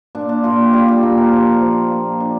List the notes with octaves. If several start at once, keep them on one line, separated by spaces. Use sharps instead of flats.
A#2 D4
D4
A#2 F4
G4
G3 F4
G4
A#3 G4
A#4
F3 G4
F3
A#3
D4